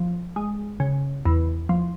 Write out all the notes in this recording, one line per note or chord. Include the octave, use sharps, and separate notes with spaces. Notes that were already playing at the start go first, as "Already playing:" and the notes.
Already playing: F3
G#3
C#3
E2
F3